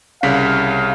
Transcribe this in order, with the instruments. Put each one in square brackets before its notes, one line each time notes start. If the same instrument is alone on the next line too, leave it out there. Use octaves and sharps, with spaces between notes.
[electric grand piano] C2 C#3 B6 [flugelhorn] F5